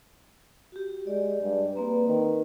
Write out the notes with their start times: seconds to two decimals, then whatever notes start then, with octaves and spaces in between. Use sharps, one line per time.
0.72 F#4 G4
1.07 G#3 D5
1.42 G2
1.75 A#3 C4 B4 A#5
2.08 D#3 B4